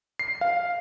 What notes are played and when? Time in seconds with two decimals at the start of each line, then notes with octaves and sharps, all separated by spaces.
0.19 C7
0.41 F5